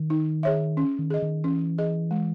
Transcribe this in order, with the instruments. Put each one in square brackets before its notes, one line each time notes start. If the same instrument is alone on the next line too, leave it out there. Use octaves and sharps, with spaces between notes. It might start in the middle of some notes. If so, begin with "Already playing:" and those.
Already playing: [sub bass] D#3
[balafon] D#4
G#4 C#5 E5
C#4
[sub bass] D#3
[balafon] G#4 D#5
[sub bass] D#3
[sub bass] E3 [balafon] C#4
[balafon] G#4 D#5
G#3